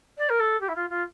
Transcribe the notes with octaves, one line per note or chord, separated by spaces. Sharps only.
D5
A#4
A4
G4
E4
F4
F4